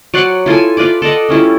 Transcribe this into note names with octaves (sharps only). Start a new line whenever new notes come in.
F#3 D5 F#5 C6
E4 F4 A4 G#5
F4 B4 D5 D6
A4 D5 D#5 F#5
G3 C#4 E4 F4